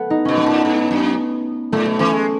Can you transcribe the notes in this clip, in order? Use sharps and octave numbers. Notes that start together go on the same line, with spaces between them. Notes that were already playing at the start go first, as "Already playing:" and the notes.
Already playing: A3 B3
D#4
B2 C#4
B3
A2
G#2
F#2
A2 A3
B2
E3 C#4
G#3